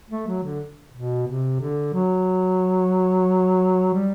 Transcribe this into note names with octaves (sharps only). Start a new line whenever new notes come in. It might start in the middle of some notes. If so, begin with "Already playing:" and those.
A3
F#3
D3
B2
C3
D3
F#3
G3